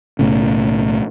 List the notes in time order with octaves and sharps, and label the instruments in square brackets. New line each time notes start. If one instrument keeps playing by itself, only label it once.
[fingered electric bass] B1 A2 C#3